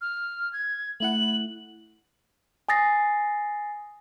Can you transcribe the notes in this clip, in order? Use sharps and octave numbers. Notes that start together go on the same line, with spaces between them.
F6
G#6
A3 E4 F#5 F#7
G#5 D#6 A6 A#6 C7